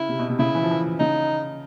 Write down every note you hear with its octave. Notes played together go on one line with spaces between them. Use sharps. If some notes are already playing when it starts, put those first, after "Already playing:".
Already playing: C#3 E4
C3
B2
C3
C#3 E4
E3
F3
E3
C#3 D#4